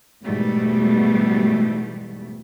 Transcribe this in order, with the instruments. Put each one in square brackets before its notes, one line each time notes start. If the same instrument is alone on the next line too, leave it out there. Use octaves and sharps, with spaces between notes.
[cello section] E2 G#2 B2 G3 A3